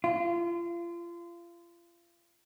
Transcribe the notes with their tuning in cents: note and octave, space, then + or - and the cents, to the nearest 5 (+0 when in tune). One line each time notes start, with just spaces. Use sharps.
F4 -30